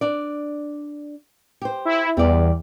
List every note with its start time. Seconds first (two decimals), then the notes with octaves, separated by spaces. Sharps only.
0.01 D4 D5
1.62 G4 C5
1.85 E4
2.17 E2 G3 D5